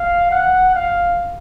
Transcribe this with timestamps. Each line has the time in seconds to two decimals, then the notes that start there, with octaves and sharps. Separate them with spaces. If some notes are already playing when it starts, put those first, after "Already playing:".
Already playing: F5
0.31 F#5
0.75 F5